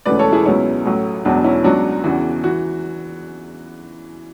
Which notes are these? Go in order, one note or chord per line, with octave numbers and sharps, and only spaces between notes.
E1 D2 C#3 E3 B4 D5
A4 C#5
E4 G#4
C#2 B2 F#3 C#4 E4
A1 A2 F#3
E1 E2 B2 F#3 D4
C#4 E4
C#2 B2 F#3 D4 F#4
E2 C#3 E3
E3 F#4